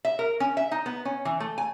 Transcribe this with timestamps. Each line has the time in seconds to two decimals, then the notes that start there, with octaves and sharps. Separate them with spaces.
0.05 E5
0.19 A#4
0.40 C#4
0.57 E5
0.72 D#4
0.86 B3
1.05 C#4
1.25 E3
1.40 A3
1.58 G#5